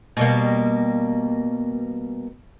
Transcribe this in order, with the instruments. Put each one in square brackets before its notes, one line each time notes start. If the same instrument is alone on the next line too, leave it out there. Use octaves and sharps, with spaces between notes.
[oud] B2 G3 A#3